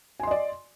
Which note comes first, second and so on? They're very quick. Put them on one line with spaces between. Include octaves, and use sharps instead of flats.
G#5 C6 D#5 D5